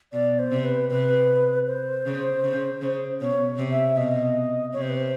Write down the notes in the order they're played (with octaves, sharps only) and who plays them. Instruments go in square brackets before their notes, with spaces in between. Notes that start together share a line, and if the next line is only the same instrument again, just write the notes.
[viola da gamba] B2 [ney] D5
[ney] C5
[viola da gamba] C3
[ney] B4
[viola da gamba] C3 [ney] B4
[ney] C5
[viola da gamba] C#3
C#3
C#3
[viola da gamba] B2 [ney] C#5
[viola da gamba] C3
[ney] E5
[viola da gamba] B2 [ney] D#5
[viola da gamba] C3 [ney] C#5
[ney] C5
B4
C5